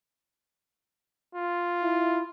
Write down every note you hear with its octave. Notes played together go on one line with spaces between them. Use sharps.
F4
E4